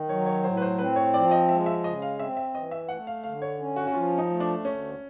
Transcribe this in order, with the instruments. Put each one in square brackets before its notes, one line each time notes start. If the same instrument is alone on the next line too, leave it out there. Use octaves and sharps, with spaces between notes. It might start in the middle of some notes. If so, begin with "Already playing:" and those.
Already playing: [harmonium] D#3
[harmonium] F#3 [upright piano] C#5
[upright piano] C#5
[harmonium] A2 [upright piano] C5
[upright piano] B4
C5
[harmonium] C4 [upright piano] B4
[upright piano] C#5
[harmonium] F3 [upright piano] D5
[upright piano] D#5
[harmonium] G#3 [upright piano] E5
[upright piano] E5
[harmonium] C#3 [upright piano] D#5
[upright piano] F5
[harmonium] C4 [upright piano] E5
[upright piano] E5
[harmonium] E3 [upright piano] D#5
[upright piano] E5
[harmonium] A3 [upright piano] F#5
[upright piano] F5
[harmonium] D3 [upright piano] F5
[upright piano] C#5
[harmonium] C#4
[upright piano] F#4
F#4
[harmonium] F3 [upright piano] F4
[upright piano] D#4
[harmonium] A3
[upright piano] D4
[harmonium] D2 [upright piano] C#4